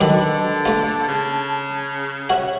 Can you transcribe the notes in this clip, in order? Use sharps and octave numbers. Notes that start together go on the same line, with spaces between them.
F#2 D3 D#3 A4 B4 D#5 A5
A3 F4
C#3
F#4 C#5 E5